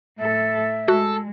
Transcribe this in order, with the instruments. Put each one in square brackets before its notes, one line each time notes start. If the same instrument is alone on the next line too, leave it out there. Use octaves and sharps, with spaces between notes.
[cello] A2 A4 [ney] E5
[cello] G#3 [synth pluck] F#4 [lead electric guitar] A4